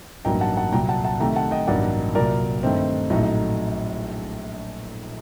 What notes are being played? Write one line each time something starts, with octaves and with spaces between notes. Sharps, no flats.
A1 G2 F#3 A#3 D#4 G5 A#5
F#5 A5
F#5 A5
C2 A#2 F#3 G5 A#5
F#5 A5
F#5 A5
C2 C3 D#3 A3 G5 A#5
F#5 A5
D#5 G5
A1 G2 F#3 A#3 D#4 D5 F#5
C2 A#2 F#3 A#4 D5
G2 D#3 A3 C4 D#4
A#1 A2 F#3 A3 D#4